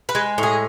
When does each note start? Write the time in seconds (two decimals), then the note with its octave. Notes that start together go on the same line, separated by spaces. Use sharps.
0.09 B4
0.15 G#3
0.38 A2
0.43 G#4